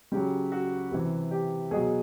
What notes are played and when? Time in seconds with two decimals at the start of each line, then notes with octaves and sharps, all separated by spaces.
0.12 C#3 F#3 G4
0.52 F#4
0.91 C3 E3
1.31 G4
1.71 B2 F#3 G#4